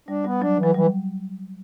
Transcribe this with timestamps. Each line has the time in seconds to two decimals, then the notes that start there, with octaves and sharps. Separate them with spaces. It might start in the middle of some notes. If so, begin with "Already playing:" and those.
0.08 G3 D4
0.25 G3 B3
0.41 F#3 D4
0.59 E3 F#3
0.74 E3 G3